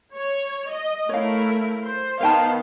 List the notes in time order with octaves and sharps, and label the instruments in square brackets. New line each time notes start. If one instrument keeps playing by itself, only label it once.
[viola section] C#5
D#5
[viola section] A3 E4 A#4 [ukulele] C#5 F5
[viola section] C5
[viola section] D#3 B3 F5 [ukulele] C5 G5 A5